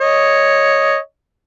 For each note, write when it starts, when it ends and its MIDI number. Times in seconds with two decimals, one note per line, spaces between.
0.01 0.97 73
0.01 0.97 75